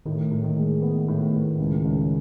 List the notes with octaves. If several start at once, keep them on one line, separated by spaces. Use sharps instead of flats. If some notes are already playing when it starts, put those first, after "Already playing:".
A2 D#3
A2
D#3
G#3
B3
A2
A2
C#2
C#2